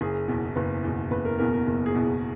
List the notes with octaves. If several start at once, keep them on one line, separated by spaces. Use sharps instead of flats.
F#1 G#4
E2 B2
F#1 B4
E2 B2
F#1 B4
A#4
E2 B2 A#4
A#4
F#1
G#4
E2 B2